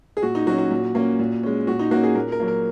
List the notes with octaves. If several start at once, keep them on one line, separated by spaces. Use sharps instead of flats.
G#4
A#2 F#4
D#4
F#3 C#4 F#4
F#4
A#2
A#3 C#4
A#2
G#3 C#4
A#2 F#4
D#4
A#3 C#4 F#4
G#4
A#2 A#4
A#4
F#3 A#3
A#4